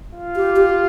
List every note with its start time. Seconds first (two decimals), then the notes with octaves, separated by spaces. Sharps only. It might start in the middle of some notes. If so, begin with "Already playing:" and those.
0.15 F4
0.36 G4
0.56 G4